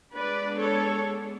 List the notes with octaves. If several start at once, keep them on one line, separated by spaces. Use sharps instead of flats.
G#3 B3 D4 B4 D5
A4 C#5